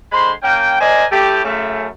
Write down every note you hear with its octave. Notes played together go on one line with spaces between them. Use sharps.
D3 G#3 C5 B5 C6
A#3 C#4 G5
A#4 C5 D5 D#5 G#5
A2 A3 G4
F#2 C#3 A3